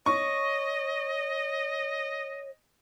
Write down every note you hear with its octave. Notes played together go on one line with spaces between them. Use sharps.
C#5 D#5 C#6